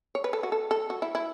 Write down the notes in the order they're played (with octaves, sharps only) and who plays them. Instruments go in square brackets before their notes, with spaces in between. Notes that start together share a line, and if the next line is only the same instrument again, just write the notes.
[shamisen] C#5
B4
A4
F#4
A4
A4
F#4
E4
E4